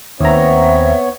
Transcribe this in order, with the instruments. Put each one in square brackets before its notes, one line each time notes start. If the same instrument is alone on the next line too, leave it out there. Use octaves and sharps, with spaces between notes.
[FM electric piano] D#2 A#5 [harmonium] B3 C#5 [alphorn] C4 [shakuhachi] E5